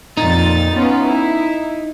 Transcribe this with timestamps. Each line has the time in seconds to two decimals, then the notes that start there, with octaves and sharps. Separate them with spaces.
0.17 F2 A#2 D#4 A6
0.76 B3 C#4 F4
1.05 E4